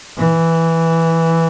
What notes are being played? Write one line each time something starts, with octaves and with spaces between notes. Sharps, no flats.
E3